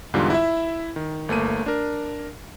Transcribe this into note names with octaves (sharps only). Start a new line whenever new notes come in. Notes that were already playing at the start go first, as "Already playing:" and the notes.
E2 G#2 D3 G3 F4
E4 E5
D#3
G1 A3 A#3 D#7
D4 A#4